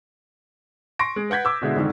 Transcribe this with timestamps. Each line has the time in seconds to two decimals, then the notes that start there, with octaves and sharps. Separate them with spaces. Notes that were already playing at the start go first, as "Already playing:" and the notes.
0.99 C6 C#6 A#6 D7
1.16 G#3
1.30 B4 F#5 G6 G#6 B6
1.45 D6 E6
1.62 B2 D3 G#3 E4
1.75 F2 G#2 D3 D#3